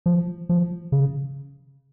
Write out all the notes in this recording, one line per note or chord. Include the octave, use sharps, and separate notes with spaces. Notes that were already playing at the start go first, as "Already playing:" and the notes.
F3
F3
C#3